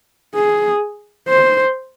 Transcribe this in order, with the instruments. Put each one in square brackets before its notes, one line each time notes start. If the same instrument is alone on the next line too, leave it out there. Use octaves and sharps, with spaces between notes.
[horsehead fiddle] G#4
C5